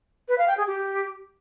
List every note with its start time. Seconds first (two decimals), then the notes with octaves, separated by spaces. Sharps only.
0.28 B4
0.38 F5
0.48 G5
0.57 G#4
0.67 G4